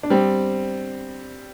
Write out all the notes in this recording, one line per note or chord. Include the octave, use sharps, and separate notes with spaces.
D4
G3 C4